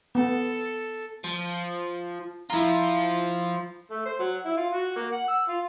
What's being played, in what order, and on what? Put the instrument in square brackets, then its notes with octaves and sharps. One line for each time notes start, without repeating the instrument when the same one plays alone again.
[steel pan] B3 [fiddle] A4
[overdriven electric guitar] F3
[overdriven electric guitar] F3 F4 [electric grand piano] E4 A#5
[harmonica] A3
C5
F#3
E4
F4
F#4
A#3
F#5
E6
F4